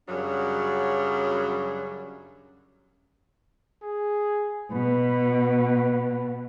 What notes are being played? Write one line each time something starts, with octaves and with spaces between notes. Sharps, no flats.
F#2 C#3 F#3 G3 D4
G#4
B2 B4